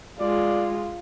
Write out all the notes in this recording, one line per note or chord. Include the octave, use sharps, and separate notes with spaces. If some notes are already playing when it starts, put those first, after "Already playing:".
G#3 F4 D5